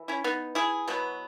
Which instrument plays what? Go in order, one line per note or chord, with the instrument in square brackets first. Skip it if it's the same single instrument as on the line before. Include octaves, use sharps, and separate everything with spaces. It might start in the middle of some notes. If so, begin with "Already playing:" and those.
Already playing: [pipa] E3
C#4 E4
B3 D#4
E4 G#4
B2 F#3 B3